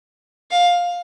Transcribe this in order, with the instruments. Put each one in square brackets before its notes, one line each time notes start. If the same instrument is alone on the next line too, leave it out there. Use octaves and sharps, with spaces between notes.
[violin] F5